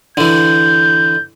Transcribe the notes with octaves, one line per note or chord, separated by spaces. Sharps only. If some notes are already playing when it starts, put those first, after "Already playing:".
D3 E3 G6